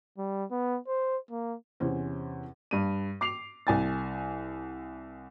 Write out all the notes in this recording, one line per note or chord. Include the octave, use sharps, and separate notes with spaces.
G3
B3
C5
A#3
E2 C3 C#4 C5
G2 D#7
D6 C7 F7
C2 G#5 A6